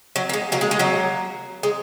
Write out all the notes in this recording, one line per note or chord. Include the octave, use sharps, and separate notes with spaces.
F#3
A#3
G#3
F#3 A#3
G#3
G#3
F#3 A#3
G#3